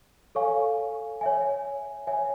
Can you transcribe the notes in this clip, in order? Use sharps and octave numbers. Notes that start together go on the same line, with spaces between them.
A4 C#5 F5 G#5 C#6
C#5 E5 G#5
C#5 E5 G#5